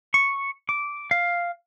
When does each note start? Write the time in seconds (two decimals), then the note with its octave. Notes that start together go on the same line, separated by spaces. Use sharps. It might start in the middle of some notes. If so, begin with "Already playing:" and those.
0.14 C#6
0.69 D6
1.11 F5